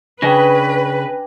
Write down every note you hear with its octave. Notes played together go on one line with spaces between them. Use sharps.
C#3 D4 B4 G5 G#5 A#6